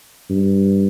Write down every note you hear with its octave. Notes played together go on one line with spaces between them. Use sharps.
G2